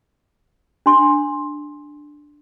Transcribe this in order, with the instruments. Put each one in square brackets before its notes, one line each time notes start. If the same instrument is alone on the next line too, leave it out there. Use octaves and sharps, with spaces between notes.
[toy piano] D4 C6